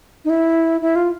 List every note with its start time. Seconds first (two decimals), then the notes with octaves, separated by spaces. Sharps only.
0.25 D#4
0.30 E4
0.81 E4
0.96 F4